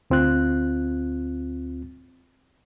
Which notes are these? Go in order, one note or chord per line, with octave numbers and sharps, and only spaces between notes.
D2 C4 F4 F#6